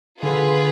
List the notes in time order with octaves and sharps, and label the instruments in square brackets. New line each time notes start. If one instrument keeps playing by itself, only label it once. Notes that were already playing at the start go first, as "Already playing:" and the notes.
[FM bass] D3 [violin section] F4 G#4 B4